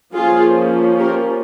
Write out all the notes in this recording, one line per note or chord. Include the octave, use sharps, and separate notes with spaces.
F3 A#3 C#4 F4 G#4
G4 A#4